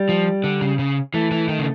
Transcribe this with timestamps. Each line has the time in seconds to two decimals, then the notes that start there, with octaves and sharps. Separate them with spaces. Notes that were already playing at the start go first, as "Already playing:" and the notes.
Already playing: G3
0.09 F3
0.44 D3
0.61 C#3
0.79 C#3
1.14 E3 A3
1.31 E3
1.48 D#3
1.59 C#3